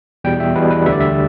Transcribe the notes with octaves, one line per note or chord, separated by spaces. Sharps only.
E2 B2 G3 G5
E5
E2 B2 G3 B4
B4
D2 D3 G3 E5
D5
E5